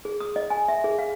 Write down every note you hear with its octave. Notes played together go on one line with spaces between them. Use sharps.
G#4
D#6
D#5
G#5
E5
G#4
F5